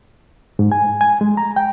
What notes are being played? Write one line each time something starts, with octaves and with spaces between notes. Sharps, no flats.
G#2
G#5
G#5
G#3
A#5
G5